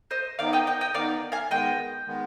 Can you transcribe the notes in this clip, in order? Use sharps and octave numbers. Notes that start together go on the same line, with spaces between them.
C5 D#5
D#3 B3 D#4 D5 F5
D#5 G5
D#5 G5
D#5 G5
D#3 B3 D#4 D5 F5
F5 G#5
D#3 G#3 B3 D#5 G5
D#3 G#3 B3